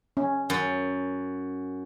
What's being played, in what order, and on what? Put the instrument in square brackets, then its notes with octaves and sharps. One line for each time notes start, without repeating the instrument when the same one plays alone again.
[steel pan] C#4
[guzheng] F#2